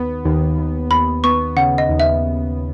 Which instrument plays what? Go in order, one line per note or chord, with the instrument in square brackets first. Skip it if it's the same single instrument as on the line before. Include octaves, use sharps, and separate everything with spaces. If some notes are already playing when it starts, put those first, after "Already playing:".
Already playing: [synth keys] D#2 B3
D#2
D#2
[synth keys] D#2 [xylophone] B5
[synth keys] B3 [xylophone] C#6
[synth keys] C#3 [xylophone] F#5
[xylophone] D#5
[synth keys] D#2
[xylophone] E5